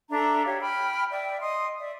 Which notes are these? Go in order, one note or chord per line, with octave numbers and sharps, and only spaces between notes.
D4 A4 E5 A#5
G4 C#5 F5
G5 B5 F6
D5 E5 G5
D#5 C6 D#6
D5 E5